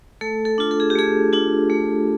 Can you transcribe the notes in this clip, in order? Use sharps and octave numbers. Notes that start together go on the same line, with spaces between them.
A3 A4
A4
D4 F4
A4
G#4
G4
A3 G#4
D4 F4
A3